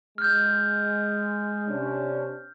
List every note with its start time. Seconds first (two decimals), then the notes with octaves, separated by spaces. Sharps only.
0.18 G#3 F6 G6
1.68 C3 C#4 D4